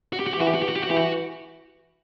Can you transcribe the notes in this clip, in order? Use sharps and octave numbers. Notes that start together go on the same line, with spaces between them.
F#4
G4
F#4
G4
E3 F#4
G4
F#4
G4
F#4
G4
F#4
E3 G4
F#4